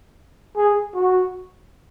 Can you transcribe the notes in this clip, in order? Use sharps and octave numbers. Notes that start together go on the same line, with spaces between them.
G#4
F#4